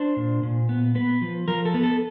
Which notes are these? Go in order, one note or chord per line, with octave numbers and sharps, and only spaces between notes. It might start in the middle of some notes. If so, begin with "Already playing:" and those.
Already playing: D4 C5
A#2
A#2
B3
B3 B4
F3
F3 A#4
A4
B3
A4